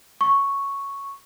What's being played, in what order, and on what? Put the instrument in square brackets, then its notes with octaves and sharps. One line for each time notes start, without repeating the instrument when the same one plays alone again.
[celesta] C#6